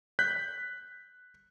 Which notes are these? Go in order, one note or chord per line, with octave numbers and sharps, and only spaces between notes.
F#6 G6 B6